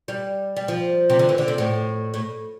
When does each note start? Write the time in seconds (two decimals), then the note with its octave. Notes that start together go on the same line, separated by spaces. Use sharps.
0.08 G3
0.56 G3
0.68 F3
1.10 C3
1.19 D3
1.29 E3
1.38 D3
1.48 C3
1.58 A2
2.14 A2